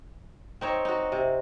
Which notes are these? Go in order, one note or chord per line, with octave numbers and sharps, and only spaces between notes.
C4 D#4 C#5
D#4 F#4
C3